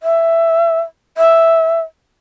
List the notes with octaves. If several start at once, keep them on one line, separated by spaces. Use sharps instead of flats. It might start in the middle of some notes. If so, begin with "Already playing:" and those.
E5
E5